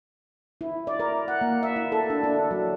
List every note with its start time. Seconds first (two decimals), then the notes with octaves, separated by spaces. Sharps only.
0.61 E4
0.87 D5
1.00 A#4
1.28 F#5
1.41 A#3
1.63 E5
1.76 E4
1.92 A4
2.10 D4
2.24 D4
2.51 F#3